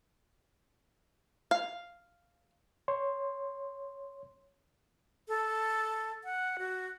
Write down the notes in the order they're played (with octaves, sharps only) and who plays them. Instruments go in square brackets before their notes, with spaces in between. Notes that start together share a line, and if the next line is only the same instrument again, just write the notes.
[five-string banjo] F5
[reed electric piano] C#5 C6
[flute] A4
F#5
F#4